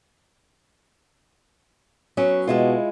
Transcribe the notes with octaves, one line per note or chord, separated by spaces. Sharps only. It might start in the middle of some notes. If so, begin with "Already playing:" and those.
F#3 B3 C#4
B2 G#3 E4 F4